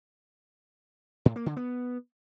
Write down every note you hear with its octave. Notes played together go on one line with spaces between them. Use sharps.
A2
A#3
D3
B3